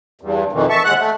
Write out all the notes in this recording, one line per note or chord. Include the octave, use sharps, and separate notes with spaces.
E2 G2
F2 B2 D#3 E3
E5 A5 C#6
D#2 G#3 F#5 F#6
A3